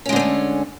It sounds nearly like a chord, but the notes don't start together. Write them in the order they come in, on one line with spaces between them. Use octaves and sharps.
C#4 G#3 D3 C4 A3